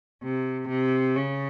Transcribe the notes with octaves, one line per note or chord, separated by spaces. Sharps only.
C3
C3
C#3